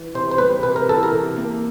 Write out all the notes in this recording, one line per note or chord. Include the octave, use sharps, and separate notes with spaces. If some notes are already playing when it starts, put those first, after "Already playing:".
Already playing: E3
C3 C5
C5
G3 B4
C3 B4
A#4
E3 A4
A#4
C3
A#3